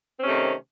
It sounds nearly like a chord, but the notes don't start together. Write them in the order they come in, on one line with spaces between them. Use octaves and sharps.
C4 C#4 C3 A3 D#3